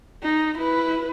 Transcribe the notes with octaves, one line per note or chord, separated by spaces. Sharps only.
D#4
E4 B4